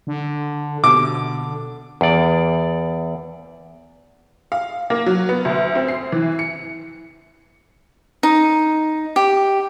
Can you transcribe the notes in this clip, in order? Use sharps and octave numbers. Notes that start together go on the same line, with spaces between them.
D3
B2 D3 D6
E2 D5
F5
A#3
F#3
B3
D2
C4
C7
E3
C#7
D#4
G4